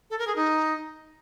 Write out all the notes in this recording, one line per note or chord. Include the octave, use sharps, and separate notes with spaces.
A4
A#4
G#4
D#4